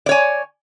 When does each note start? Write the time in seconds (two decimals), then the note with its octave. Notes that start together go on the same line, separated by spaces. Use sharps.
0.06 D5
0.09 C#5
0.11 G#5